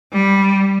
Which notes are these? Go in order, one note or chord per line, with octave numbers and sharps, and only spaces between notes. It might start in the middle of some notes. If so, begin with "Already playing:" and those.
G3